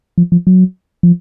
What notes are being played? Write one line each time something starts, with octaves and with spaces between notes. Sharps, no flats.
F3
F3
F#3
F3